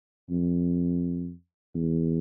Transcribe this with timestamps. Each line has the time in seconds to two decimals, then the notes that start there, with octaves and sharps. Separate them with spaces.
0.30 F2
1.75 E2